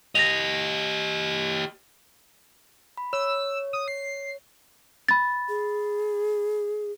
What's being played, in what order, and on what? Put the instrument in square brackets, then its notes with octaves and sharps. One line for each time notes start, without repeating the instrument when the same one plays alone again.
[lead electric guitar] G4 D#5 [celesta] A#6 F7
[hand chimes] B5
[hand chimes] C#5 [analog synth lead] E6
[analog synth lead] D#6
C7
[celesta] B5 A6
[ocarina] G#4